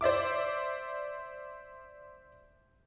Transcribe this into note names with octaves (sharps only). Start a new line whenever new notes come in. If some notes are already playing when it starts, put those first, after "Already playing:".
C5 D5 E5 D6